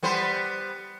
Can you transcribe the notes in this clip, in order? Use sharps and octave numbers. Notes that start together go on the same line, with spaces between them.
G3 B3 C5